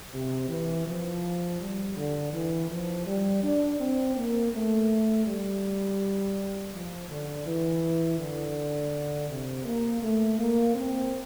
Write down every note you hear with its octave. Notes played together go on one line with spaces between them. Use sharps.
C3
E3
F3
G3
D3
E3
F3
G3
D4
C4
A#3
A3
G3
F3
D3
E3
D3
C3
A#3
A3
A#3
C4